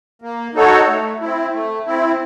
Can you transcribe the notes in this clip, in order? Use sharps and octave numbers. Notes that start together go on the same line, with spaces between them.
A#3
D#4 F#4 A4 C#5
A3
C4 E4
A3
C4 E4